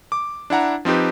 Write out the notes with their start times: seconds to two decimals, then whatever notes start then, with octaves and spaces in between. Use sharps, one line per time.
0.12 D6
0.50 D4 E4 F#5 A#5
0.85 F3 C4 D#4 G4 B4